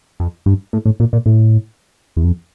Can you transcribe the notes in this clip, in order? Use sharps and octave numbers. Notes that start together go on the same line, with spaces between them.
F2
G2
A2
A2
A#2
A#2
A2
E2
F2